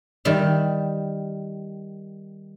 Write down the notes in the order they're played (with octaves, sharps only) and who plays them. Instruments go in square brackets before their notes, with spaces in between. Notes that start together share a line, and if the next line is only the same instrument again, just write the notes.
[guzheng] D#3 G3 E5